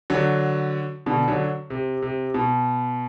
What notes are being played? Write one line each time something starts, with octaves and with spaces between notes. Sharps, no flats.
D3 F#3
B2 D3
D3 F#3
C3
C3
B2